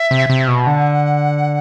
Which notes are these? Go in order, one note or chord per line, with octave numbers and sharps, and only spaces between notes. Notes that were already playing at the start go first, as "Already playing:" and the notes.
Already playing: E5
C3
C3
B2
D3 F#5